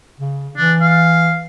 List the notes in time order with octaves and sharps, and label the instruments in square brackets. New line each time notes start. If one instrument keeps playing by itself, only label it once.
[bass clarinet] C#3
[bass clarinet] E3 [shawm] D4
[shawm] F5